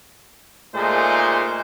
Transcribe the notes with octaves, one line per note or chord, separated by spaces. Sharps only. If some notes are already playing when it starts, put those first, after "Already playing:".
A#2 G#3 A3 D#4 C5